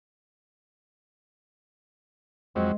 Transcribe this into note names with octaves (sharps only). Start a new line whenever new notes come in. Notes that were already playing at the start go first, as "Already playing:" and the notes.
F2 F#3 G#3 C4